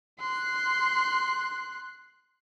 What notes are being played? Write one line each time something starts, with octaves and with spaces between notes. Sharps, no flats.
C6 F#6